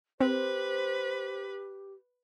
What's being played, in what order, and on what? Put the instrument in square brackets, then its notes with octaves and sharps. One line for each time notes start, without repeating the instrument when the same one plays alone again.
[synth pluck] C4 [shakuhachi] G4 [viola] B4 [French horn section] C5